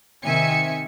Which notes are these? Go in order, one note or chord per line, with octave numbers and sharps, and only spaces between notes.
C3 D#3 E5 G#5 C#7